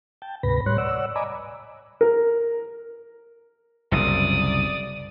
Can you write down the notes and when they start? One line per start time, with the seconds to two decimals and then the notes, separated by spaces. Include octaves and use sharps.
0.22 G5 A5
0.43 D2 G#2 C3 B4 B5 A#6
0.66 A2 G3 C#5 C6 F#6
0.78 C#5 D5 F#5 E6
1.16 D5 D#5 G#5 A#5 B5 D6
2.01 A#4
3.92 F#1 C2 F#2 D5 D#6